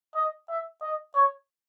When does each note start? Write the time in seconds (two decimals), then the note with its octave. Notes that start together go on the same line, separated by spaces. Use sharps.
0.15 D#5
0.49 E5
0.82 D#5
1.15 C#5